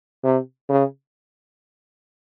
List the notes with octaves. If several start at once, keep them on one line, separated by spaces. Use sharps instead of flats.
C3
C#3